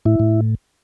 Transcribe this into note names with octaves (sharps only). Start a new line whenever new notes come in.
A2 E4
A2